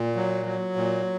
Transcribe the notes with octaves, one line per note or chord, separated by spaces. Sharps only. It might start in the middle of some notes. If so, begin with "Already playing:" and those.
Already playing: A#2
F#3
F#3
A#2